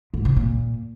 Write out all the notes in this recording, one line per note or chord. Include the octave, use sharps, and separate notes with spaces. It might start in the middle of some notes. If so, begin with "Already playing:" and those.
G#2
C3
A#2